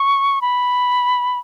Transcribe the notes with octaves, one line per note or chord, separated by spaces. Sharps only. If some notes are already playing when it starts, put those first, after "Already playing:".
Already playing: C#6
B5